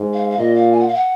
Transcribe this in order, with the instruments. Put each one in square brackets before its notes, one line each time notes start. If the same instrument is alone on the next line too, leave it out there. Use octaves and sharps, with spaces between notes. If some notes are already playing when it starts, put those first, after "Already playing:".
Already playing: [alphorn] G#2
[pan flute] F5
F5
[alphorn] A#2 [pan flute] D#5
[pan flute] F5
G#5
F#5
F5
F#5